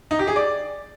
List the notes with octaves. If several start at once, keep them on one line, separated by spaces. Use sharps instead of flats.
D#4
G4
G#4
D5